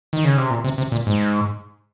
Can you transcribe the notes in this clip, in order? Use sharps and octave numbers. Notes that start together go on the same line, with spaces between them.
D#3
C#3
C3
A#2
C3
C3
A#2
G#2